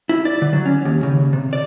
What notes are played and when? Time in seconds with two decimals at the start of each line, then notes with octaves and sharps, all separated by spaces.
0.09 E4
0.25 D5
0.42 D3
0.53 F#3
0.66 C#4
0.85 D#2
1.03 C#3
1.33 C3
1.53 D5